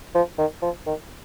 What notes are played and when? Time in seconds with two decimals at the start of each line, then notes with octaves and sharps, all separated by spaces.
0.15 F3
0.39 D#3
0.63 F3
0.87 D#3